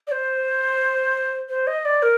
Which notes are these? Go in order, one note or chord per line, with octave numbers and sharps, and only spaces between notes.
D5
C5
C5
D#5
D5
A#4